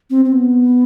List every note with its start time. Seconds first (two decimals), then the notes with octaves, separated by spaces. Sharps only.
0.10 C4
0.25 C4
0.32 B3